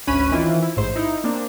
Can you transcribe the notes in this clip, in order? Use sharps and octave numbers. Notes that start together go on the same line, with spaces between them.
G#1 D2 C#4 B5 F#6 D#7
D#3 E3 C4 E4 F4
E4
A1 G#2 C5
D#4 E4
A#3 C4 D4